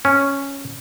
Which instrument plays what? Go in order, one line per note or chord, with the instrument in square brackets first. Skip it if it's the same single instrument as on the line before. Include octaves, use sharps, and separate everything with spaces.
[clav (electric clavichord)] C#4